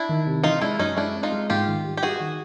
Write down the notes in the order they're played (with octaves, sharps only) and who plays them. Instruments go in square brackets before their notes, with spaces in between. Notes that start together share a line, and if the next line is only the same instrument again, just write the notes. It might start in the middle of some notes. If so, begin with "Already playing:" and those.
Already playing: [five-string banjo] D4 E4
[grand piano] D#3
C3
[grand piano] E3 [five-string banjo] D#4 F4
[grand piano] G#3 [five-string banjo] D4 E4
[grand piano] F#2 [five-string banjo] C#4 D#4
[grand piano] G#3 [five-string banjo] D4 E4
[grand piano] C4
[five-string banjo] D#4 F4
[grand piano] G#3
[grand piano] G#2 [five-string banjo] F4 G4
[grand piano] D#3
G3
[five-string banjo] G4
[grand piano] G3 [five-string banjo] F#4 G#4
[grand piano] D#3